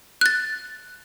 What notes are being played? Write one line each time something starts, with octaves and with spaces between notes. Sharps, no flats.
F#6 A6